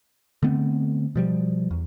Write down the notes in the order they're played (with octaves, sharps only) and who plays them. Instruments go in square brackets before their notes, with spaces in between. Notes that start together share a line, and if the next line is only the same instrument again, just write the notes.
[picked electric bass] D3 A3 B3 C4
B2 F3 G3
E2